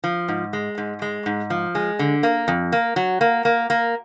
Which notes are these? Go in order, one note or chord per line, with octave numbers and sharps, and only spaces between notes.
F3
G#2
G#3
G#2
G#3
G#2
F3
G#3
D3
A#3
F2
A#3
F#3
A#3
A#3
A#3